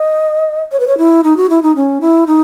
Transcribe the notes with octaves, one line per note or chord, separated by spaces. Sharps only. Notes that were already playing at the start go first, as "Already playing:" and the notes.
Already playing: D#5
C#5
B4
C#5
E4
D#4
F#4
E4
D#4
C#4
E4
D#4